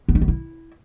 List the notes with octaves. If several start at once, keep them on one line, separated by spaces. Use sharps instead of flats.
B3
D#4
B3
E4